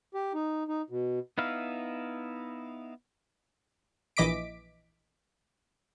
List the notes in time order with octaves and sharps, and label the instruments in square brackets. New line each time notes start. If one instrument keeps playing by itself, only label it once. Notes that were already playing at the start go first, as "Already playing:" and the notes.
[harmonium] G4
D#4
D#4
B2
[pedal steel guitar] B3 D#4 E4 F5
[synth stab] A#1 E3 D#5 D6 B6 D7